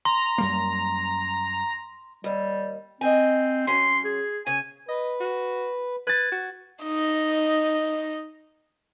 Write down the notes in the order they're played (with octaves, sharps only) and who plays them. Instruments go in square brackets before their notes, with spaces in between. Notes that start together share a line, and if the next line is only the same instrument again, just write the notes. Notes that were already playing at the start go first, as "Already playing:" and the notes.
[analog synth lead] A#5 [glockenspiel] C6
[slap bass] F#2 G3 A#3
[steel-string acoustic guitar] D#2 [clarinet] G3
[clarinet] C4 [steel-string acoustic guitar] D#5 G#5
[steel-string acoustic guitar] F#3 C#4 [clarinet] C6
[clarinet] G#4
[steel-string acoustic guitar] C#3 [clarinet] G#5
[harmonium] B4 [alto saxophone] D#5
[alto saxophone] F#4
[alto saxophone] B4 [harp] G#6 A6
[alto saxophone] F#4
[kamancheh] D#4 D#5